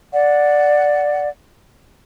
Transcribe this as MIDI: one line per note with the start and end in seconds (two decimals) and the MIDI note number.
0.13 1.28 74
0.13 1.28 78